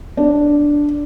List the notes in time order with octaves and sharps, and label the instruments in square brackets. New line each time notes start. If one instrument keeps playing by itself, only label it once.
[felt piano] D4